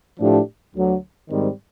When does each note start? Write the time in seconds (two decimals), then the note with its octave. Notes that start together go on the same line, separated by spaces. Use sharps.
0.19 A2 F3 A3 D4 G4
0.74 D2 D3 F#3
1.29 G#2 D#3 G3 C4